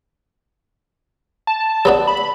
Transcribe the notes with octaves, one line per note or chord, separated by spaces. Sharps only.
A5
F#3 B3 D4
B5